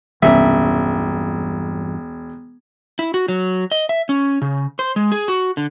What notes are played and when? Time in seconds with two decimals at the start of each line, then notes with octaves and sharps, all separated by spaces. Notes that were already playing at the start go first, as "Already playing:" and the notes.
0.22 E1 C2 G2 E3 F#3 C#4 E5
2.99 E4
3.14 F#4
3.28 F#3
3.71 D#5
3.89 E5
4.09 C#4
4.42 C#3
4.79 C5
4.96 G#3
5.12 G#4
5.28 F#4
5.57 D3